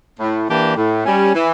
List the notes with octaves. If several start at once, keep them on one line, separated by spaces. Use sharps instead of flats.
A2
E3 A#3 D4 G4
A2
G3 C#4
E3